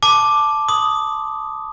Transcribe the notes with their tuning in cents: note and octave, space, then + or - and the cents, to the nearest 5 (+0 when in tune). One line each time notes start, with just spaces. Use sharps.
A5 -5 D6 +5
C6 +0 D#6 +0